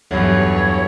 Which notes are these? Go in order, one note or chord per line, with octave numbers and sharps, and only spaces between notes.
E2 G2 E3 F#3 A4 C#5